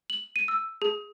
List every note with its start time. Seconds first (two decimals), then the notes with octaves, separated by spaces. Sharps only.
0.10 F#7
0.36 D#7
0.48 E6
0.82 G#4